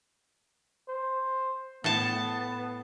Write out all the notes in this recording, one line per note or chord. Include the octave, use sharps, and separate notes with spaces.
C5
A2 B3 A5